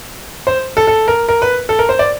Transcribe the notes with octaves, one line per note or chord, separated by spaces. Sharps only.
C5
A4
A4
A#4
A#4
B4
A4
A#4
C5
D5